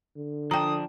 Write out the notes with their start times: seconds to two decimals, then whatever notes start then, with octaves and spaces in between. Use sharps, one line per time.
0.16 D3
0.51 F3 D4 G5 A#5 D#6